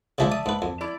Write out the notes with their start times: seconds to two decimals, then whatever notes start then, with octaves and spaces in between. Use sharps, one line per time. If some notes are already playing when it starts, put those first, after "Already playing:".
0.18 C#3 F3 G#3 D5 E5 A5
0.32 D#6
0.46 G#2 B4
0.62 F2
0.81 E4 D5